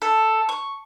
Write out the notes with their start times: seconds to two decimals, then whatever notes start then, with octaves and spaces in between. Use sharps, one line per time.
0.02 A4
0.49 C#6